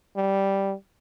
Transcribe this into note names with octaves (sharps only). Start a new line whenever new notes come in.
G3